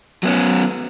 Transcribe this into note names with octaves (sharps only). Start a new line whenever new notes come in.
F#3 B3 C#4